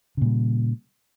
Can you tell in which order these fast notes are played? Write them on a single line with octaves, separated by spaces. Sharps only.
C#3 A#2 G3